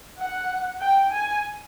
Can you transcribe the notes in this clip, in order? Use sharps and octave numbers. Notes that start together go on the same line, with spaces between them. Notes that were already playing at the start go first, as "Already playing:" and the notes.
F#5
G5
G#5